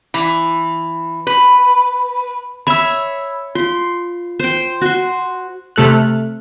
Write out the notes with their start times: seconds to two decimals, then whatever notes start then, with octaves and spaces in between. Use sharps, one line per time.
0.14 E3
1.27 B4
2.67 C#5 E5 B5 E6
3.55 F4 C6
4.40 C5 G5
4.81 F#4 C6
5.76 C3 A3 A4 F6 F#6